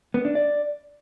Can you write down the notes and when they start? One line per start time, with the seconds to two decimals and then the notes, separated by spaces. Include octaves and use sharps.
0.14 B3
0.25 D4
0.35 D5